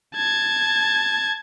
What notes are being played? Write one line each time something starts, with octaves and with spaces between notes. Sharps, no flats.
A5 G#6